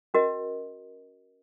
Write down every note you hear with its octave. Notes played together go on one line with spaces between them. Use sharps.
C#4 F#4 A#4 D#5